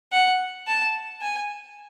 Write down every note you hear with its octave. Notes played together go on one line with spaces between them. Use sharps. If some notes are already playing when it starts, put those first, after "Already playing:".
F#5
A5
G#5